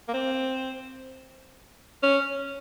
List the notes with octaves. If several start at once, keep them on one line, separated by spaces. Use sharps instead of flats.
A#3
C4
C#4